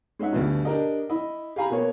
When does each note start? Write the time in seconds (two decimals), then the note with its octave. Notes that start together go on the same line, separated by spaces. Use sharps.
0.19 G#3 C#4 D#4 E5 F#5
0.33 D2 G2 B2
0.65 D4 G4 A#4 D#5
1.10 E4 D#5 B5
1.56 G4 G#4 F5 G#5 A#5 B5
1.70 B2 A#3 C#5